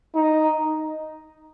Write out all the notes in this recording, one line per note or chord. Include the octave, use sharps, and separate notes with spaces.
D#4